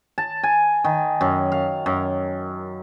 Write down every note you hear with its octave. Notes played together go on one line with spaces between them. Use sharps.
A5
G#5
D#3
F#2
F5
F#2